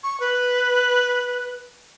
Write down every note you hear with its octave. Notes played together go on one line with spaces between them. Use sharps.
C#6
B4